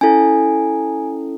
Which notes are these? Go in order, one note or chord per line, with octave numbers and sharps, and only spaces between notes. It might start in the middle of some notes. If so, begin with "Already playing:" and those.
C#4 E4 A4 G#5